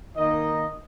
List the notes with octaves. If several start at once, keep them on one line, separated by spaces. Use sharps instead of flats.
D#3 A#3 D#4 D#5